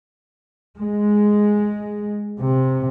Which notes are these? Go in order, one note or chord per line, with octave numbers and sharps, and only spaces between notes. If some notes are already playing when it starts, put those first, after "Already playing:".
G#3
C3